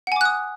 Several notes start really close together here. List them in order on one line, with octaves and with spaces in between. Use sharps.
F#5 G#5 D6 F#6 D#6